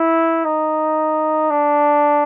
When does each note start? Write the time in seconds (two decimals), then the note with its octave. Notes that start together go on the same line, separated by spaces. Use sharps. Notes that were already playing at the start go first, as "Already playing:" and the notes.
Already playing: E4
0.45 D#4
1.51 D4